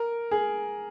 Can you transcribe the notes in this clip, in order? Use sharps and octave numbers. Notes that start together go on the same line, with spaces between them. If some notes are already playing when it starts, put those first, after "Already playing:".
Already playing: A#4
G#4